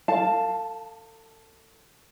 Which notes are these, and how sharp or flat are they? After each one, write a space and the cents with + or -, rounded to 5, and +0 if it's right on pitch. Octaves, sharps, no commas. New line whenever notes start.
A4 +35 F5 +0 A5 +0